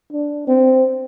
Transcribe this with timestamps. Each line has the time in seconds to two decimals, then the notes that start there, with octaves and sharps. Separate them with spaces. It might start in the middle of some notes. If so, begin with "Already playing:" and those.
0.12 D4
0.47 C4